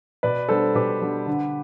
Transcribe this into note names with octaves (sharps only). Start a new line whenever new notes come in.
B2 B4 D5
G3 B3 D4 A4 C5
B2 G4 B4
G3 B3 D4
D3